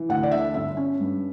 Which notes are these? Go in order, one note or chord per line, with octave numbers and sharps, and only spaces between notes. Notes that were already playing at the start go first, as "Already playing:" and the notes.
Already playing: E3
D2 F#5
D5
D3 E5
G1 E5
C#4
G2